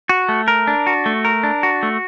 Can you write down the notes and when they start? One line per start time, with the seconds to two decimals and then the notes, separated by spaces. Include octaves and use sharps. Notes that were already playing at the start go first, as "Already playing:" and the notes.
0.09 F#4
0.29 A3
0.48 A#4
0.67 D4
0.87 F#4
1.06 A3
1.25 A#4
1.43 D4
1.63 F#4
1.83 A3